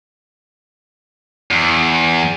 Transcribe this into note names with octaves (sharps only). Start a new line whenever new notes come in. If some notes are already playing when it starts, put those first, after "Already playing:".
E2